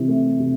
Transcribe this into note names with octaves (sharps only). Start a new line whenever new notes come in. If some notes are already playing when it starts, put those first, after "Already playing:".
Already playing: C3 E3
A3
C3